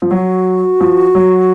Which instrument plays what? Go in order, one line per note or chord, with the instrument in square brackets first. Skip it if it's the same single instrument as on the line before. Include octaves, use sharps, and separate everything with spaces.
[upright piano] F3
[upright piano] F#3 [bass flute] F#4
[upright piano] F3
F#3